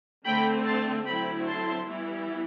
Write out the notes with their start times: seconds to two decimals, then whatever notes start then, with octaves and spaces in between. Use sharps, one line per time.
0.25 D3 A3 C4 G5 B5
0.66 A5 C6
1.05 D3 F#3 A3 C4 E4 G5 B5
1.46 A5 C6
1.87 E3 G3 B3 E4